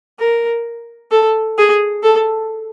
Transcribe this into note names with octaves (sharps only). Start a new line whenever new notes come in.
A#4
A4
G#4
A4